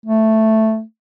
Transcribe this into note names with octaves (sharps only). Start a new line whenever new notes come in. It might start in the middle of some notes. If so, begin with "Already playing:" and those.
A3